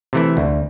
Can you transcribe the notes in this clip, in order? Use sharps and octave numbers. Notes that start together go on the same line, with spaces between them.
C3 E3 A3 E4
D2